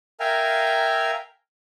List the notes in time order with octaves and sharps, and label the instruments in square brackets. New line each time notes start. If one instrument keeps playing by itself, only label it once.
[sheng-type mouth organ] A#4 E5 F5 G5 G#5 A#5